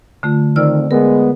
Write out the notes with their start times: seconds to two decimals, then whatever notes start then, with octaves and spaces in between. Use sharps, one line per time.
0.23 D3 A3 F4
0.56 F2 D#3 C4 D5 E6 F6
0.91 G#3 B3 A#4